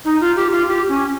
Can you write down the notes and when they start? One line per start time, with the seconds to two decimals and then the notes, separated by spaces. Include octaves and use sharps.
0.05 D#4
0.21 F4
0.36 G4
0.52 F4
0.68 G4
0.89 C#4